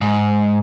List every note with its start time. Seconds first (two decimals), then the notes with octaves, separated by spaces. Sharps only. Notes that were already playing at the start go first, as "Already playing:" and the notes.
0.01 G#2